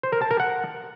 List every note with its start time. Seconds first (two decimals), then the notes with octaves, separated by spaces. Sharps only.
0.03 C5
0.12 A#4
0.22 A5
0.31 A#4
0.40 F#5